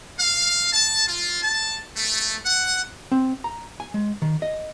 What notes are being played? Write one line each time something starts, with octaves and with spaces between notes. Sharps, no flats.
F5
A5
F4
A5
A3
F#5
C4
A#5
G#5
G#3
D#3
D#5